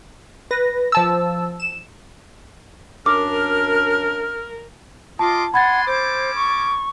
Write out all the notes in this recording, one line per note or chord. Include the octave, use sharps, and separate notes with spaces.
B4 A#6
F3 A5 E6
E7
F#2 D4 A#4 D6 F6
F4 D#5 A5 C6 D6
D4 F#5 G#5 B5 C6 G#6 A6
C#4 A4 C5 D6
C#6